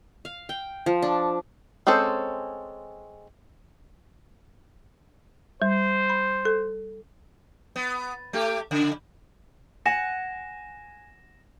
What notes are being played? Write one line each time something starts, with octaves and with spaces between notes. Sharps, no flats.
F5
G5
F3
D4
G#3 C4 C#4 A4 C5
G3 C5
B5
A4
B3
A3 G4
C#3
F#5 G#5 A#6 E7